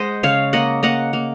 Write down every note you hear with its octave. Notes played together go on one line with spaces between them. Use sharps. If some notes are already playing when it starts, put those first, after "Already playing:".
Already playing: G#3 C5 D#5 F#5
C#3 C#5 F5
A#3 D#5 F#5
A#3 D#5 F#5
A#3